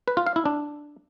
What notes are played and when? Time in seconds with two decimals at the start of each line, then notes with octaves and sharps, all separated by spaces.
0.08 B4
0.17 F4
0.27 F5
0.36 E4
0.45 D4